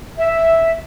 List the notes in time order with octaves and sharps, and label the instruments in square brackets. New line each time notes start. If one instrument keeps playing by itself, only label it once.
[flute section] E5